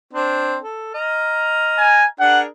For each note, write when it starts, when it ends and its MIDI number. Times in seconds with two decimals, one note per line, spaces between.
0.13 0.56 60
0.13 0.56 62
0.63 0.92 69
0.94 2.05 75
0.94 2.05 82
0.94 2.05 89
1.79 2.05 80
2.20 2.45 62
2.20 2.45 68
2.20 2.45 70
2.20 2.40 78